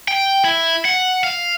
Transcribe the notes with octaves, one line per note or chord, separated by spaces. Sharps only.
G5
E4
F#5
F5